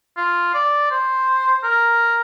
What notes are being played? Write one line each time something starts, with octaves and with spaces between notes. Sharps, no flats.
F4
D5
C5
A#4